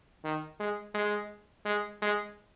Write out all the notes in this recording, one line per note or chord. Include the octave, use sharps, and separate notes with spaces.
D#3
G#3
G#3
G#3
G#3